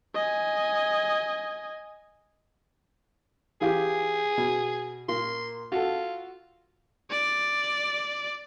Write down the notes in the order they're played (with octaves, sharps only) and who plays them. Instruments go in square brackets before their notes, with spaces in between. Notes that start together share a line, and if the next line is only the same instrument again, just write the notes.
[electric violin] D#5 G#5
[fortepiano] E3 F4 G4 [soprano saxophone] G#4
[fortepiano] B2
[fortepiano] A#2 A#3 [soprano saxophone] C6
[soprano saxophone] F4 [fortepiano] F#4 A4
[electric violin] D5